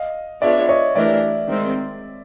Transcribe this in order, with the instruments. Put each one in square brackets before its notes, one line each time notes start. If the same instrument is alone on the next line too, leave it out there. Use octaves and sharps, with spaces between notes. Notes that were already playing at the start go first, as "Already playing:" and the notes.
Already playing: [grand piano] D#5 F5
[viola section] B3 D4 F4 G#4 C#5 [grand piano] D5 E5
[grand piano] C#5 D#5
[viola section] E3 A3 D4 G4 A#4 [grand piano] D5 E5
[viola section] D#3 G#3 C4